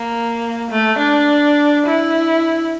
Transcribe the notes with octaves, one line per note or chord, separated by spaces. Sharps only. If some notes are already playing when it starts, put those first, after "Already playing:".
Already playing: A#3
A3
D4
E4